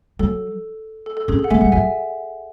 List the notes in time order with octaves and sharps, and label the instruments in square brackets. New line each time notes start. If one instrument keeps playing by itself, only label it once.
[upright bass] F#3 [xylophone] A4
[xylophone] A4
A4
[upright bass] C#4 [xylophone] G#4
[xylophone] A4
F#5
[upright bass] A3 [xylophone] E5 G#5
[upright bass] G#3 [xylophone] F#5
[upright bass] F#3 [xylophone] E5 G#5